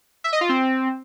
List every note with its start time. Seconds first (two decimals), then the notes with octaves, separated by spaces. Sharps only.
0.24 E5
0.33 D#5
0.41 F4
0.49 C4